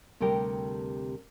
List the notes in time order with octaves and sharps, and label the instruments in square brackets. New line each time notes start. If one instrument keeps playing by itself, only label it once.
[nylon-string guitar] D2 C3 G3 A#4 G5